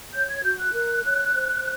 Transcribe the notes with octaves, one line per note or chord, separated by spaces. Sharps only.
C#5 G6
G#6
F#4 G6
F#6
A#4
C#5
C5